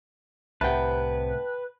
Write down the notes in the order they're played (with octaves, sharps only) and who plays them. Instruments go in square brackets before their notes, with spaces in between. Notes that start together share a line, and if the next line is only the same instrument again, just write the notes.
[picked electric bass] C2 A2 C3 [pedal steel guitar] B4 [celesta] E5 F#5 [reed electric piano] G5 A5